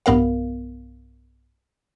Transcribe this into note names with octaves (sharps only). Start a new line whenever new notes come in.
B1 G2 B3 A#4 F5